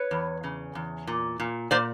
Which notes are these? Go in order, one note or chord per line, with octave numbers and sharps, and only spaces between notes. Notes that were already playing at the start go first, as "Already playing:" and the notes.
Already playing: B4 C#5
E2
C#3
E2
A#2
A#2
A#2 C5 D5